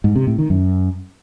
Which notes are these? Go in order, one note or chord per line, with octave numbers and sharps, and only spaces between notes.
G#2
C3
A2
D#3
F#2